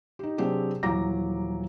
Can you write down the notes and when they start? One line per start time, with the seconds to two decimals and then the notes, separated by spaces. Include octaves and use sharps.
0.19 D#4 G4
0.38 C3 F#3 C4 D4 G4 G#4
0.83 D#1 E3 F#3 A#5 D6 A#6